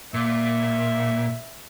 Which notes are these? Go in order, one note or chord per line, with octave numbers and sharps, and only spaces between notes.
A#2 E5